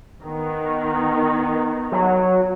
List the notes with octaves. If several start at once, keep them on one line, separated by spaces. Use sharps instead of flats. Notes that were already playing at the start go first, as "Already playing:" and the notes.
D#3 B3 D#4
F#3